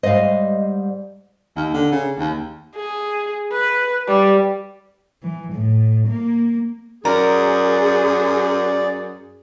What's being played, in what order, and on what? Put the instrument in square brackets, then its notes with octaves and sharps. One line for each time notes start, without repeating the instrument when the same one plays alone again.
[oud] G#2 G3 [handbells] C5 [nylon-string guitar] D#5 F5
[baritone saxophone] D#2
D3
C#3
D#2
[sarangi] G#4
B4
G3
[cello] E3
A2
A#3
[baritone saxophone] F#2 [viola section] G#4 [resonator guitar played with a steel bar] A#4 [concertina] D5